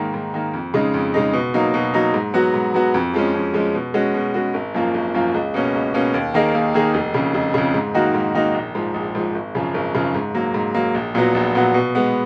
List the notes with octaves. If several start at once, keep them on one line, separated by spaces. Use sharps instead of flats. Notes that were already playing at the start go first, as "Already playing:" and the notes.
Already playing: G#2 D#3 A#3
G#2
D#3 A#3
F2
C#3 G#3 D#4
F2
C#3 G#3 D#4
B2
F#3 A#3 D#4
B2
F#3 A#3 D#4
G#2
F#3 B3 F#4
G#2
F#3 B3 F#4
F2
F3 G#3 C#4
F2
F3 G#3 C#4
B2
G#3 C#4 F#4
B2
G#3 C#4 F#4
G#1
F#2 F3 A#3 F4
G#1
F#2 F3 A#3 F4
C#2
B2 A#3 C#4
C#2
B2 A#3 C#4
D#2
D#3 A#3 D#4 G#4
D#2
D#3 A#3 D#4 G#4
F1
F2 C#3
F1
F2 C#3
G#2
D#3 A#3 D#4 F#4
G#2
D#3 A#3 D#4 F#4
A#1
G#2 F3
A#1
G#2 F3
G#1
F#2 C#3 F3
G#1
F#2 C#3 F3
G#2
F#3 A#3
G#2
F#3 A#3
A#1
A#2 F#3 B3 F#4
A#1
A#2 F#3 B3 F#4
B2
G#3 B3